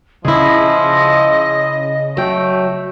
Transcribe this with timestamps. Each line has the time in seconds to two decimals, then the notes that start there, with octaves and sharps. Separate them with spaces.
0.25 C#3 F3 E4 G#4 D#5
2.17 F#3 A3 G5